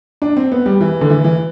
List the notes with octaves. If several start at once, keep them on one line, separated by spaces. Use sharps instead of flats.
D4
C4
B3
G3
E3
D3
E3
E3